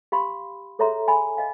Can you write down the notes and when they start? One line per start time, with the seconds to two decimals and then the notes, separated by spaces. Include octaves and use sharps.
0.12 G4 F5 B5 C6
0.79 G#4 A4 C#5 E5 A#5 C6
1.08 G#5 B5
1.37 D#5 F5 G#5